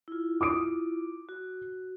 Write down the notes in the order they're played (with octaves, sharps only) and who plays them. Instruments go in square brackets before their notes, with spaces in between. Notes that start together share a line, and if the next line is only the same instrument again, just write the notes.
[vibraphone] E4 F4
[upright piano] D6 D#6 D7
[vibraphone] F#4